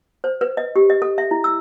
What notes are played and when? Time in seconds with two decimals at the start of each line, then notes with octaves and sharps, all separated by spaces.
0.24 C5
0.41 B4
0.57 D#5
0.76 G4
0.90 D#5
1.02 A4
1.18 E5
1.31 E4
1.44 E6